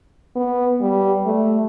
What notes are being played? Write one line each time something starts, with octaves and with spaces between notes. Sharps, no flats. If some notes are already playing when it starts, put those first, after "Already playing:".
B3
G3
A3